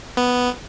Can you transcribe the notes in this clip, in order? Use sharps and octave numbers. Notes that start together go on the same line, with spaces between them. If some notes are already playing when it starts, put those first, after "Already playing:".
B3